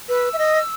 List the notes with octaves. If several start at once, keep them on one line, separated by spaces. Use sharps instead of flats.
B4 E6
E5
D#5